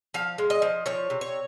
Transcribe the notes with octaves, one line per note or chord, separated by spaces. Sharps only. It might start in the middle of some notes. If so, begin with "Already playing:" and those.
F3 F5
G#3
D#5
F3
F3 C#5
C3
C#5